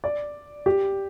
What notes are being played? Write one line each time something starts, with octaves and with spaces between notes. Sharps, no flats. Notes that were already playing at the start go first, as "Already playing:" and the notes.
D5
G4